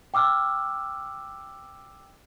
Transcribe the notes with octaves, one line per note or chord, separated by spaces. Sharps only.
G5 D6 E6 F6